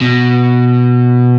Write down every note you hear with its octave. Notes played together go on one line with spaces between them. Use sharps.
B2